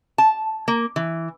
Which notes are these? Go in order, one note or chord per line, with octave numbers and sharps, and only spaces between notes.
A5
A#3
E3